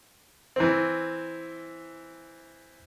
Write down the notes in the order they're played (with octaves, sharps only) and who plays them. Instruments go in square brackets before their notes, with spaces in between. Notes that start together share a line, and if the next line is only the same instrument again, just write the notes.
[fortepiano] E3 C4